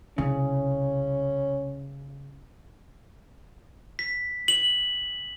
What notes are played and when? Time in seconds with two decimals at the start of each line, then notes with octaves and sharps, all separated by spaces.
0.18 C2 C#3 G3 C#4
3.99 B6
4.48 F#7